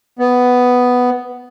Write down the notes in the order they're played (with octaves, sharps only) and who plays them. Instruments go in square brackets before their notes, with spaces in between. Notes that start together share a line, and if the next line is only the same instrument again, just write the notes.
[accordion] B3